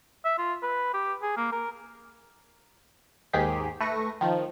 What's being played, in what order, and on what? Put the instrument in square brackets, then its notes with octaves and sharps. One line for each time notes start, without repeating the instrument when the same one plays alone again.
[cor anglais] E5
F4
B4
G4
G#4
A#3
A#4
[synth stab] D#2 G#2 D#3 G4 G#4 B6
A3 B4 C#6 A#6
D#3 F3